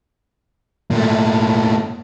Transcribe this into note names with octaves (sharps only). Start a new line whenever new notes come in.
A#2 A3